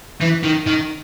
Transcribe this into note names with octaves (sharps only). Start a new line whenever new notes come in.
E3
D#3
D#3